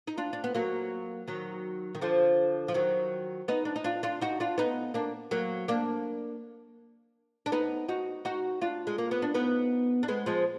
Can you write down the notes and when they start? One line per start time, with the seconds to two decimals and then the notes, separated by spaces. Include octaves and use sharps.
0.07 D#4
0.18 D4 F4
0.33 D4
0.44 B3
0.54 F#3 A#3
1.28 D#3 F#3
1.95 D#3
2.01 D3 F3
2.68 F3
2.74 D#3 F#3
3.48 B3 D#4
3.65 D4
3.76 D#4
3.84 D4 F4
4.03 D4 F4
4.21 D#4 F#4
4.40 D4 F4
4.58 B3 D#4
4.94 A#3 D4
5.31 F#3 A#3
5.68 A#3 D4
7.46 D4
7.52 B3 D#4
7.88 D#4 F#4
8.25 D#4 F#4
8.61 D4 F4
8.87 G#3
8.98 A#3
9.11 B3
9.22 D4
9.34 B3 D#4
10.03 D4
10.08 G#3 B3
10.26 F3 G#3